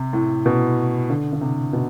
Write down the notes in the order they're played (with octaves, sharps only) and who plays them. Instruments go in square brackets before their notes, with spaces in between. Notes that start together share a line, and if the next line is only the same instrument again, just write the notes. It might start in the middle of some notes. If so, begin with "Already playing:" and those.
Already playing: [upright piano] C3
A2
B2
D3
D3
C3
B2